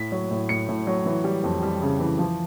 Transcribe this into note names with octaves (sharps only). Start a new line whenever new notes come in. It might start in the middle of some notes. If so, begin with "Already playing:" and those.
Already playing: A2 B6
F#3
A2
A2 C#7
A2
F#3
E3
G3
F2
G3
C#3
E3
F3